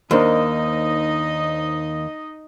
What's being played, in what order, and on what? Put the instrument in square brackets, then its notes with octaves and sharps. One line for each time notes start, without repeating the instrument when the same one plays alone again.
[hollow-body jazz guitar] D#2 [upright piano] D4 A#4 C5 [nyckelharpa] D#4 D#5